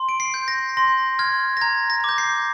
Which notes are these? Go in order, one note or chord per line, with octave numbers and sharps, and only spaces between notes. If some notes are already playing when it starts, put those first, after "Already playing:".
Already playing: C6
D7
C7
G6
A#6
C6 A#6
F6 G#6
A#6
A#5 G#6
A#6
D6 G6
C7